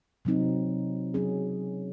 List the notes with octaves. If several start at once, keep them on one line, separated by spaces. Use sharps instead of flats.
C3 F#3 C4 D#4
F#3 C#4 G#4